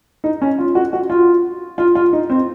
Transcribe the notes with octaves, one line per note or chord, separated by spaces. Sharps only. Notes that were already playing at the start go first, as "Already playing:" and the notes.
D#4
C#4
F4
F#4
F#4
F4
F4
F4
D#4
C4